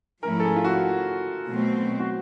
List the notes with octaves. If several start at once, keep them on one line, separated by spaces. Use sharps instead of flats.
G#2 F3 A3 C#4 E4 A#4
A4
G#4
F4
F#4
B2 F#3 A3 C4
F#4